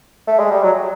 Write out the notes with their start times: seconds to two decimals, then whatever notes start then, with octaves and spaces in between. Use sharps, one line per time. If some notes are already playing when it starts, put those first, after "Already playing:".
0.28 A3
0.39 G#3
0.51 G3
0.64 F#3